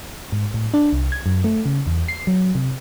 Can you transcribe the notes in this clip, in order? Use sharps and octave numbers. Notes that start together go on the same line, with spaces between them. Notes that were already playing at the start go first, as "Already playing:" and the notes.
G#2
A2
D4
C2
G#6
F#2
A3
C#3
E2
C7
F#3
C3